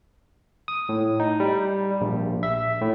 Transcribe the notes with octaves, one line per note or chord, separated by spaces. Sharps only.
D#6
A2
D#4
G3
A#1
E5
A2